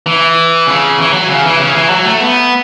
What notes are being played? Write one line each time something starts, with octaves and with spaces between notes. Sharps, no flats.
E3
C#3
E3
F#3
C#3
E3
C#3
E3
F#3
A3
B3